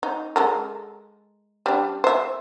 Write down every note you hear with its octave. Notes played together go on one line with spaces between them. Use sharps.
D#4
G#3 A4 A#4
G3 D4
C5 E5